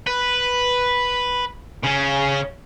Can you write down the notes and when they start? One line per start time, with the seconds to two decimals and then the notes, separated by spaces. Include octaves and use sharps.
0.07 B4
1.84 C#3 C#4